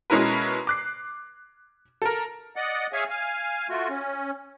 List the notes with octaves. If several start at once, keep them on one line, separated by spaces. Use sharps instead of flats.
B2 G#3 C#4 E4 A#4 B4
D6 F#6 C7
A4 A#4
D5 D#5 F#5
G#4 C#5 E5 F5 G#5
F5 G#5
A3 F4 F#4
C#4